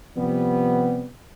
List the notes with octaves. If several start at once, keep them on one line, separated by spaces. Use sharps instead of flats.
C3 F3 G3 B3